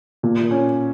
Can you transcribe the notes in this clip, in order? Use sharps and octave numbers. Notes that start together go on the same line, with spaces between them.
A#2
C#4